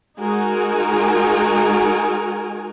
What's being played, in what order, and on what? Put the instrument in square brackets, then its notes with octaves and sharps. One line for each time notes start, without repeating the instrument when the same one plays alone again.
[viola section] G#3 D#4 F#4 A#4 G#5